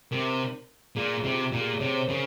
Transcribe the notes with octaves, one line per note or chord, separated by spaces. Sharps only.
C3 A#4
A#2 G#4
F4
C3
F4
G4
A#2
G#4
C3 C#5
C5
C#3 A#4